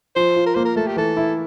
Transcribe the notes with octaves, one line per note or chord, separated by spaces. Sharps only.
F3 C5
F4
A#4
A#3 C5
A#4
A3 A4
G4
E3 A4
E4